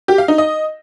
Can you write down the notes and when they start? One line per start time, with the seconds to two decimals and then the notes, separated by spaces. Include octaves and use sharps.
0.08 G4
0.18 F5
0.28 D#4
0.38 D#5